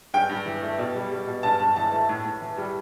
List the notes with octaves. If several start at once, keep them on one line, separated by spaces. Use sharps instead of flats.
G2 G5
G2
E3
A3
B2
G3
G3
B2
G2 A5
G2
E3 A5
A3
A2
A2
E3
G3